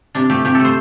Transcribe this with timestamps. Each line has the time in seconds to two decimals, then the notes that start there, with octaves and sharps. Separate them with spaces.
0.15 C3 D4
0.30 A3 G4
0.45 C3 G4
0.55 A3 A4
0.65 C5